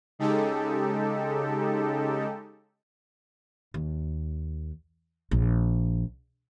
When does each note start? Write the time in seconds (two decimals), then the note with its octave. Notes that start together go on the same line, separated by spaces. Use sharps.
0.19 C#3 G#3 D#4 G4 A4
3.74 D#2
5.31 A#1